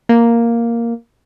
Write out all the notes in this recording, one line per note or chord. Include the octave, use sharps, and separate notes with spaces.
A#3